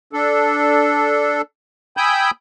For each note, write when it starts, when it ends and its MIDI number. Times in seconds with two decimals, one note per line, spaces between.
0.13 1.42 62
0.13 1.42 69
1.97 2.31 79
1.97 2.31 80
1.97 2.31 83
1.97 2.31 87
1.97 2.31 88
1.97 2.31 91